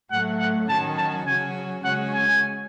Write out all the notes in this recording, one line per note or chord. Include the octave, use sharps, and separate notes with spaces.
A2 F#3 A3 F#5
F#5
D#3 F#3 C#4 F#4 A5
A5
C#3 F#3 C#4 F#4 G#5
C#3 G#3 C#4 F#4 F#5
G#5